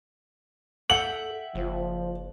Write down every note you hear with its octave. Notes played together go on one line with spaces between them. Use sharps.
A4 E5 F#5 G5 F#7
F#1 F3